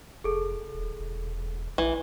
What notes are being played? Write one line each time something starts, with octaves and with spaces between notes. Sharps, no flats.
F1 G#4 A4
D#1
E1
A#1 E3